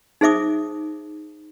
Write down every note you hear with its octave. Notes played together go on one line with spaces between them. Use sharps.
D#4 G#4 C5 E5 D6 D#6